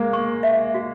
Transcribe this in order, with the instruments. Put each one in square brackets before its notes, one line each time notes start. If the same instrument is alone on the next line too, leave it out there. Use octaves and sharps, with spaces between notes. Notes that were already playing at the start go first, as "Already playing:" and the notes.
Already playing: [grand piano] G#3 A#3
[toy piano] C#6
E5
F#4